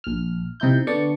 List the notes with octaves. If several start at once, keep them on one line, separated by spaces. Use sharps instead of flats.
A#1 F6
C3 D#4 E4 G6
D3 B3 D4 D5 C#6